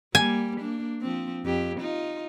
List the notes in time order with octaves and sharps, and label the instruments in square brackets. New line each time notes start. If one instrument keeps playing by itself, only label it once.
[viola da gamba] G3 A#3 [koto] G#5
[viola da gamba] A#3 D4
F3 C4
F2 G4
D#4 F4